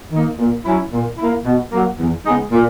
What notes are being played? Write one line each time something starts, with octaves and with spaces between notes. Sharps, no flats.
D#3 A#3 D#4
A#2
F#3 C#4 E4
A#2
A#3 E4
B2
F#3 A#3
E2
C#3 G#3 B3 D#4
A#2